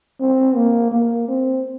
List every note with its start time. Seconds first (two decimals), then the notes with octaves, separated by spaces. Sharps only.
0.20 C4
0.55 A#3
0.92 A#3
1.28 C4